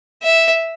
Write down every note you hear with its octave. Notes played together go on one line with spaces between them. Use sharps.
E5